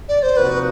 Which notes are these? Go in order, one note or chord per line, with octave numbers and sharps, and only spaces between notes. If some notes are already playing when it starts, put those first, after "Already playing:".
D5
C5
C3 F3 A#3 D#4 F#4 B4